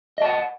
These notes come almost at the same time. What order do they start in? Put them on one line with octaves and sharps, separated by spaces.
D#5 A5 F#5